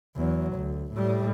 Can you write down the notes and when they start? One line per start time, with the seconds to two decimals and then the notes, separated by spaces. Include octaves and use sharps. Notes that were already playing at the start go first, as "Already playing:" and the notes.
0.17 E2 F#3
0.54 D2
0.93 A2 G3